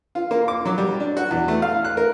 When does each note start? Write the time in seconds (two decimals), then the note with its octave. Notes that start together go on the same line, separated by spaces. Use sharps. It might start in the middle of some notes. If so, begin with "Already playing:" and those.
0.15 F4
0.31 A#3
0.48 D6
0.65 F#3
0.78 G3
1.00 D4
1.17 F#4
1.31 E2
1.48 A3
1.62 F5
1.85 F#6
1.97 A#4